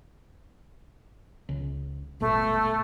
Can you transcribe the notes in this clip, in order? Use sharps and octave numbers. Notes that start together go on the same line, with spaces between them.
C#2
D#1 G#1 B2 A3